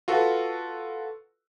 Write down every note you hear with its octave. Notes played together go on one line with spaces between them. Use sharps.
F4 F#4 A4 B4